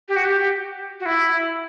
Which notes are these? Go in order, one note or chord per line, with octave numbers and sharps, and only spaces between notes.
G4
F#4
G4
F#4
E4